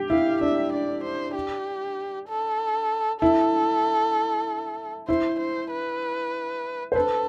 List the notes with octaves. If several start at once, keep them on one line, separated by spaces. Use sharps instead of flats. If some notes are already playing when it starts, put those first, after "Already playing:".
Already playing: G4
E4 F5
D4 E5
D5
C5
G4
A4
E4 A4
E4 C5
C5
B4
C5
A4 B4